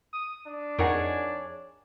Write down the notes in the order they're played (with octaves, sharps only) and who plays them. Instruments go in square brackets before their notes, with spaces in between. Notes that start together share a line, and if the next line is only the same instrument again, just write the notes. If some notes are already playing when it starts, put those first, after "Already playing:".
[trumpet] D#6
D4
[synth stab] F2 D#4 [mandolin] G#4 C#5 [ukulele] A#4 F#5